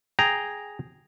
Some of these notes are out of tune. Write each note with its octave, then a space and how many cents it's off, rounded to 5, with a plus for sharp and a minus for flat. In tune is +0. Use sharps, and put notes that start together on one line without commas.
G#4 +0 G5 +0 A#5 +0